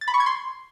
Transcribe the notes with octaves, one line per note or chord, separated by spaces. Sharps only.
A6
B5
C#6
G#6
C6